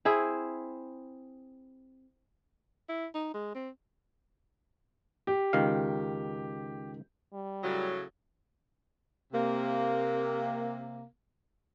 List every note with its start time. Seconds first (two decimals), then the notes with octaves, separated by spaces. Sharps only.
0.05 C4 E4 G#4
2.89 E4
3.15 D#4
3.34 G#3
3.55 C4
5.27 G4
5.53 C#2 D#3 F5
7.33 G3
7.64 A2 C#3 F#3
9.32 C3 A#3